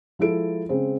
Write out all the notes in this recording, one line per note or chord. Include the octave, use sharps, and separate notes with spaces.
F3 G#3 E4 A4 D7
C#3 G#3 C4